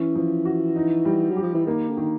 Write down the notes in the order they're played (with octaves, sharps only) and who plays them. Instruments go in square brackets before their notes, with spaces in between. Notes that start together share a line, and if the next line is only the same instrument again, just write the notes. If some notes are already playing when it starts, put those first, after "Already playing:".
Already playing: [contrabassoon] E3 [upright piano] C#4
[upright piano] F3
F#4
D#4
G3
[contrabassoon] F#3
[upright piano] G4
[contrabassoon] F3
E3
[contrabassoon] D#3 [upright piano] A#3
[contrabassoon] D3
[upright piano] D#3